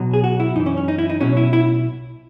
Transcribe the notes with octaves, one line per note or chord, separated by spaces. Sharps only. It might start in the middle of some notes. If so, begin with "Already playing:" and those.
Already playing: B1 B2 F#3
G#4
F#4
E4
F#2 E3 D#4
C#4
C#4
D#4
E4
D#4
B1 B2 F#3 C#4
E4
E4